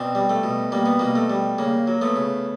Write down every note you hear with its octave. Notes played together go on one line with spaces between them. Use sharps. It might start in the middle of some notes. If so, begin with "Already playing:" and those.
Already playing: B2 C4 D4
G3
A3
B2
G3 A#3
B3
B2 A#3
A3
G3
C#3 A#3
F#3
A3 B3
C#3